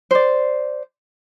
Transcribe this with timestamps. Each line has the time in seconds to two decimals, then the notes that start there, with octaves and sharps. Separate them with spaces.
0.11 C5 D5